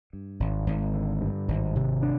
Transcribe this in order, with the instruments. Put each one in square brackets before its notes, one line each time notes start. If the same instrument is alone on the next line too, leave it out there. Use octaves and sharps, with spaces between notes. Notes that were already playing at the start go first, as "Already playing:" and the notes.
[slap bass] G2
G#1
G#1
D3
G2
G#1
C3
D4